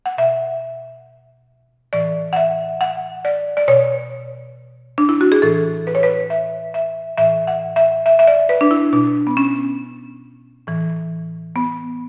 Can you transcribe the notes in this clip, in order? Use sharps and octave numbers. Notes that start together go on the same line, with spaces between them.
F#5
B2 E5
A2 E3 D5
F#5
E5
F#5
D5
D5
B2 C#5
D4
E4
F#4
G#4
A2 E3 A4
B4
C#5
B4
E5
E5
A2 E3 E5
F#5
E5
E5
E5
D5
B4
D4
E4
B2 D4
B3
C#4
A2 E3
B3